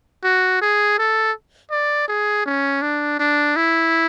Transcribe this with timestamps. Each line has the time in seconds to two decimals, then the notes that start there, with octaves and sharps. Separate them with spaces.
0.24 F#4
0.62 G#4
0.99 A4
1.71 D5
2.08 G#4
2.46 C#4
2.82 D4
3.20 D4
3.56 E4